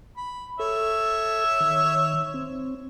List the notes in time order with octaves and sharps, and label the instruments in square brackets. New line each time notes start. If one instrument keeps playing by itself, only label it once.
[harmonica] B5
[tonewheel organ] A4 [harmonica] C#5 E5
[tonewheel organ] D#3
C4